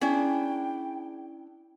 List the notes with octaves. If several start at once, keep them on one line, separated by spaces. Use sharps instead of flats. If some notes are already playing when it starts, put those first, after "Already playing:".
C#4 D4 E4 G#4 G5